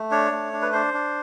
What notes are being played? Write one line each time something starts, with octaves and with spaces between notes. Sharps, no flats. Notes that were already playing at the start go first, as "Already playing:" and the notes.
Already playing: A3
D4 C#5
A3
D4
B4
D4 C5
D4